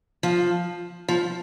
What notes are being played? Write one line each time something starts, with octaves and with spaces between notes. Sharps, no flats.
F3
F3